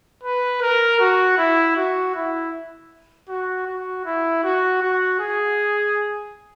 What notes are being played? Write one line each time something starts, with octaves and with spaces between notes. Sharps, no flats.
B4
A#4
F#4
E4
F#4
E4
F#4
F#4
E4
F#4
F#4
G#4